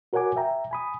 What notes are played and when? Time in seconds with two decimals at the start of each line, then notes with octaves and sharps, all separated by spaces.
0.13 F#4 A#4 C#5 F#5 G#5 D6
0.36 E5 G5 A#5
0.71 G#5 B5 D#6